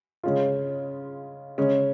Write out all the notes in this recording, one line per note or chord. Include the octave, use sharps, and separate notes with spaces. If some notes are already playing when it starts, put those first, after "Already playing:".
C#3 G#3 C#4 F4
C#3 G#3 C#4